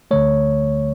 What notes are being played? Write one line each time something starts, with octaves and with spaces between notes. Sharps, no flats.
D2 D3 A3 C#5